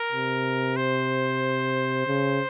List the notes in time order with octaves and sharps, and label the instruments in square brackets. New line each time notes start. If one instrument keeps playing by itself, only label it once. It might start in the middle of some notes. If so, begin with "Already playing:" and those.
Already playing: [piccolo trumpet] A#4
[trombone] C3
[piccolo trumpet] C5
[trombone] C#3